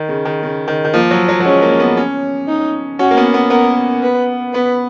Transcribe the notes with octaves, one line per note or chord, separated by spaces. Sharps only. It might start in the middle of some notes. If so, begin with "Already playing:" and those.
Already playing: D#3
C#3
D#3
C#3
D#3
D#3
F3 A#3
F#3
F#3
F#3
G#3 C#4
A#3
B3
C#4
D#4
C#4 F#4
A#3
B3
B3
B3 A#4
B4
B3 B4